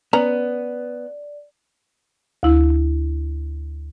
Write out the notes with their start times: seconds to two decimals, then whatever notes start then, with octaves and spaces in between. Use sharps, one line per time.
0.13 B3 C#4 D5 A#5
2.43 D2 E4